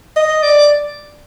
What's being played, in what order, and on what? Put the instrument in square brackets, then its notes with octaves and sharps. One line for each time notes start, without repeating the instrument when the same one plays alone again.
[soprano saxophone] D#5
D5